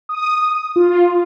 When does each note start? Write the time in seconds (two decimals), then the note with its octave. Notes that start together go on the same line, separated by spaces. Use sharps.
0.09 D#6
0.76 F4